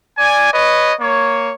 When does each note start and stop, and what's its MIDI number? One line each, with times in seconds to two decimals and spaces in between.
0.18 0.52 74
0.18 0.52 80
0.54 0.93 71
0.54 0.93 73
0.54 0.93 75
1.00 1.53 58
1.00 1.53 73